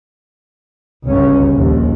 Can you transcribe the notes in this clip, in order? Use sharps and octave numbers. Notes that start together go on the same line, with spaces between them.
G1 C#2 C#4
A#1 D#2